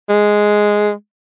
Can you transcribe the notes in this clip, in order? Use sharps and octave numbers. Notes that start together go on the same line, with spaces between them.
G#3